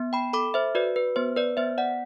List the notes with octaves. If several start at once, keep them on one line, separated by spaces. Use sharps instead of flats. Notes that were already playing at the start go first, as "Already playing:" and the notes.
Already playing: B3
G5 B5
A4 B5 D6
C5 E5
F#4 B4 D5
B4
B3 C5
B4 D5
B3 C5 E5
D5 F#5